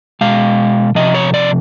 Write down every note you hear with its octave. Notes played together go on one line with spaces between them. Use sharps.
B2 G#3 F5
C3 F3 D#5
C#5
D5